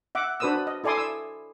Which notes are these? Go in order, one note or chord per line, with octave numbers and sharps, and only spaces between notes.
E5 F#5 D6
D4 F#4 B4 C5 D#6 E6
D#5
E4 A4 D5 G#5 C6 D#6
E6